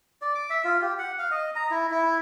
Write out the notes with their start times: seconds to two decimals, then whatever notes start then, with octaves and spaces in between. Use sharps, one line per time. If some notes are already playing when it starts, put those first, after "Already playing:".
0.22 D5
0.35 D6
0.50 E5
0.65 F4
0.82 G4
0.99 F#5
1.19 F5
1.31 D#5
1.56 A#5
1.71 E4
1.91 E4